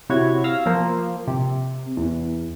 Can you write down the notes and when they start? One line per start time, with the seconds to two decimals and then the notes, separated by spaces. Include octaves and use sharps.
0.09 C3 E4 F#4 C#5 G#6
0.44 F5 E6 A#6
0.66 F3 A#3 C5
1.27 C3
1.97 E2